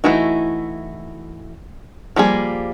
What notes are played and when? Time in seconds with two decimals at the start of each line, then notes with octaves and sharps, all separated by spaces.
0.04 E3 A3 D#4 E4 F#4
2.16 F3 G3 A#3 G#4